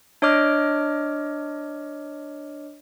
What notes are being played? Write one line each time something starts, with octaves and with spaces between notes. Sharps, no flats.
D4 C#5 D#5 D6 F6